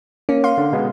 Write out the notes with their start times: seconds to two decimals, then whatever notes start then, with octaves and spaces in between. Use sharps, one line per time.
0.29 A#3 C#4
0.44 F5 C6
0.58 D3
0.73 B2 G#3 B3